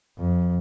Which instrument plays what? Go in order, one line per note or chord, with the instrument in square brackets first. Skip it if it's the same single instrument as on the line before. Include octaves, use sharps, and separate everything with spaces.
[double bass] F2